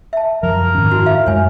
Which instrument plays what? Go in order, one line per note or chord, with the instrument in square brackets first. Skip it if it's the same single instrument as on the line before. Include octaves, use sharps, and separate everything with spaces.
[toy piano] E5 A5
[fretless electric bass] F#2 F3 F#3 [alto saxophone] A#4
[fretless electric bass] G#2 D#3 C#4
[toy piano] D#4 E4 F#4
F4 E5 F5
[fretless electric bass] F#2 G#3 [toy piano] C#5 G#5